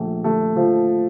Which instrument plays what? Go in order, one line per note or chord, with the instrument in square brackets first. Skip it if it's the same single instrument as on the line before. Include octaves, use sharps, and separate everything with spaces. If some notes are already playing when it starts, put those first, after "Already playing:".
Already playing: [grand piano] A#1 A3
A3
F3